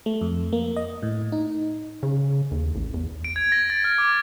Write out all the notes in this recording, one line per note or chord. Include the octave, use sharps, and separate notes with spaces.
A3
F2
A#3
D#5
A2
D#4
C#3
D#2
A1
E2
D7
G#6
A#6
A6
F6
D6